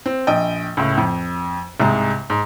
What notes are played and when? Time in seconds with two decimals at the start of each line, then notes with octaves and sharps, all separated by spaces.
0.06 C4
0.27 A#1 D#5 G5
0.77 C#2 A2
0.98 F2
1.80 C2 G#2 G#3
2.30 G#2